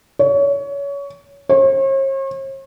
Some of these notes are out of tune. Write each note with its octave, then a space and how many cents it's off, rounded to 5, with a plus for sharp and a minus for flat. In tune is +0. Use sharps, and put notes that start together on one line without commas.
C#5 +25
C#5 -45